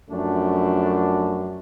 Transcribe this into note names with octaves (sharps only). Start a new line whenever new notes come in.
F#2 F3 A3 D4